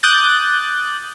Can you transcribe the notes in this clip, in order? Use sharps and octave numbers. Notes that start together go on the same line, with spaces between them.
D6 D#6 F#6 G6 A6